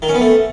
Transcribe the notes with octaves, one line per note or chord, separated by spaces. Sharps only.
D#3
C#4
B3
A3